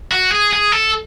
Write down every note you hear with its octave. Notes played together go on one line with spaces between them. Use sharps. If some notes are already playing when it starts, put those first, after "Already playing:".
F#4
G#4
G#4
A4